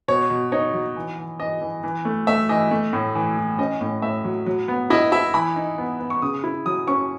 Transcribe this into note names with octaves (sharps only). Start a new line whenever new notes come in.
B2 C#5
B2
D#4 C#5
F#3
E3
E3
E3 D#5
E3
E3
A3
A3 E5
E3 D#5
A3
A2
E3
E3
C#4 D#5
A2
A2 E5
F#3
F#3
B3
E4 D#5
E4 E5
E3 B5
D#4
B3
B3
C#6
C#3 D#6
E4
F#3 D#6
C#4 C#6